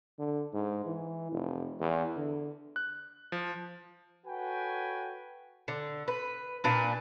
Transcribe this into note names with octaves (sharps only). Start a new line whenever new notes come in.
D3
G#2
E3
F1
E2
D3
F#6
F3
F#4 A4 B4 C#5 G5 G#5
D3
B4
A#2 D4 B4